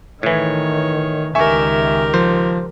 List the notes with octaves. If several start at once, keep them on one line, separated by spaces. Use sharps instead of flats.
A2 D#3 E3 C#5
C#2 D#3 G4 A#4 E5 G#5 C#6
F3 C5